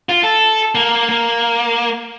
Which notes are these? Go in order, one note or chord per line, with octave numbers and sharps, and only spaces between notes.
F4
A4
A#3
A#3